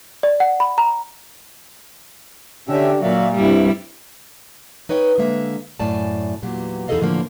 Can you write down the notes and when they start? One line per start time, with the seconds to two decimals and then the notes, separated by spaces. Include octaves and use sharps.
0.23 D5
0.40 F#5
0.60 B5
0.78 A#5
2.68 D3 C#4 D4 G4 E5
3.03 A#2 F#3 D5 E5 F5
3.35 G2 C3 G3 E4
4.89 D#4 B4 C#5 D#5 G5
5.18 D3 G#3 A#3 E5
5.80 F#2 A2 D5 G#5 A5
6.42 E2 A#2 F#3 G4
6.88 E2 D#4 G#4 A4 D#5 F5
7.00 A2 D3 E3 F3 A3 A#3